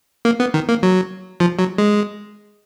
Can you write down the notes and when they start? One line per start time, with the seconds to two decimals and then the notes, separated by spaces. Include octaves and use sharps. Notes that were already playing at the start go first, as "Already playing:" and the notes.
0.25 A#3
0.40 B3
0.54 D#3
0.69 A#3
0.83 F#3
1.40 F3
1.59 F#3
1.78 G#3